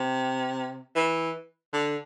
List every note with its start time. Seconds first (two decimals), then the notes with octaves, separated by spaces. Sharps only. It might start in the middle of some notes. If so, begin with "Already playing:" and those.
Already playing: C3
0.96 E3
1.73 D3